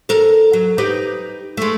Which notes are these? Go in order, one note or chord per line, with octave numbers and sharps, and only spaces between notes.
A4 A#4
F#3
D#4 G4 B4
G#3 A3